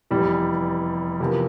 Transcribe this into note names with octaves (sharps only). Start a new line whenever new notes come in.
F1 E2 E3 G3
E2 C3 F3 A#3